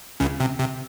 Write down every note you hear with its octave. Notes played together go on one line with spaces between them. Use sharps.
C#2 C#3
C3
C3